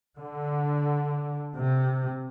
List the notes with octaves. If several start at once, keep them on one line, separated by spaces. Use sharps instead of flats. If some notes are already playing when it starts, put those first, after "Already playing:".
D3
C3